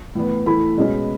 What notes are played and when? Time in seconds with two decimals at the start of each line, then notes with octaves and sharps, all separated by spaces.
0.15 A2 E3 B3
0.46 A2 E3 A3 B5
0.77 B2 G#3 C#4